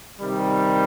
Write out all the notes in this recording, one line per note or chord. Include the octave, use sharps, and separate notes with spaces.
C3 D#3 G3